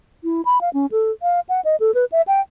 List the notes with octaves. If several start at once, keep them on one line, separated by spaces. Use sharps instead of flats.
E4
B5
F5
C#4
A4
F5
F#5
D#5
A4
B4
E5
G5